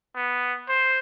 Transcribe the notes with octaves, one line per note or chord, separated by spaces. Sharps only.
B3
C5